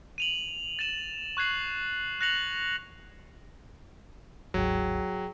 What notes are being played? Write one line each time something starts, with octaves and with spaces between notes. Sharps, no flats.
D#7 F7 F#7
A6 D#7 E7 F#7
C#6 F#6 G#6 C7 F#7
F#6 A6 A#6 C#7 F7 F#7
G1 D2 G#2 F#3 G#4 G5